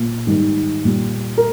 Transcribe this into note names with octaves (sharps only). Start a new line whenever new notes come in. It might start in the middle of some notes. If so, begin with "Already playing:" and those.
Already playing: A#2
G#2 D#3 G3
A#2 G3
A#4